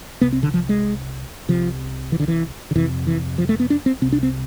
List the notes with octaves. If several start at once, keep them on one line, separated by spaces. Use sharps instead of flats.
C2 C3 B3
C4
D3
F3
G#3
C2 C3 F3
E3
D3
E3
D3
F2 C3 E3
E3
F3
A3
B3
D4
C4
C2 C3 C4
D4
C4